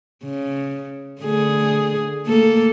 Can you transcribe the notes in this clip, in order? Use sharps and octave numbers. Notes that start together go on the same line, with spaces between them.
C#3
D3 A3 G#4
A3 A#3 A4